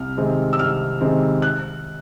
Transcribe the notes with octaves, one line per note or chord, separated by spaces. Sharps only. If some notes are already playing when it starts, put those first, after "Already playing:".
Already playing: C2 F6
C3 D#3 G#3 C4
E6
C2 F6
C3 D#3 G#3 C4
F#6